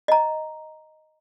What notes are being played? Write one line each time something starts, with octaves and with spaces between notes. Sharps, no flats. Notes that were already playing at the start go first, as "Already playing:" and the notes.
D#5 A#5